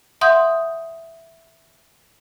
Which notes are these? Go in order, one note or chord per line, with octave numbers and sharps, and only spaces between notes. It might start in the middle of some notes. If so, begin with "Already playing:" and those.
E5 F#5 C6 D#6 G6